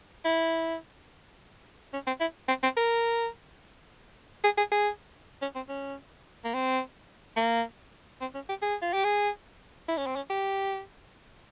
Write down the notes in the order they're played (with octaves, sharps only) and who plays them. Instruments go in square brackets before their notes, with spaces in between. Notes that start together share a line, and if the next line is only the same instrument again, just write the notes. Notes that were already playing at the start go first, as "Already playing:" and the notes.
[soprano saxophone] E4
C#4
C4
E4
C4
C4
A#4
G#4
G#4
G#4
C#4
C4
C#4
A#3
C4
A#3
C4
C#4
G4
G#4
F4
G4
G#4
E4
C#4
C4
C#4
G4